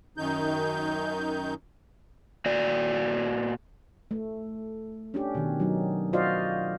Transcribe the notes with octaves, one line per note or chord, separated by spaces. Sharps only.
F#2 D#3 D#4 G6
A#2 F#4 D5
A3
C#4 D4 G4
B2 D#3
F#3 D#4
F4 F#4 C5 D5 D#5 F5